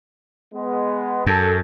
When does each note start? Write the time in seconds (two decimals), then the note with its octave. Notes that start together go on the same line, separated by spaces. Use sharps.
0.54 G#3 B3
1.26 F#2 A4